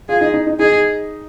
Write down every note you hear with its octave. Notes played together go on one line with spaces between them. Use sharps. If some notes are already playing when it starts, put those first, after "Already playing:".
F4 G#4
D#4
D#4
D#4
D#4 G#4